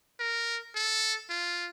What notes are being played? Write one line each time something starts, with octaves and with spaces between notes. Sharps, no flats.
A#4
A4
F4